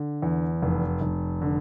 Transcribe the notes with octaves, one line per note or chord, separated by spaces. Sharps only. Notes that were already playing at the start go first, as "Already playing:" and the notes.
Already playing: D3
E2
F1
F1
D3